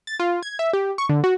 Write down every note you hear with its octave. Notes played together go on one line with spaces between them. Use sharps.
A6
F4
G#6
E5
G4
C#6
D3
F#4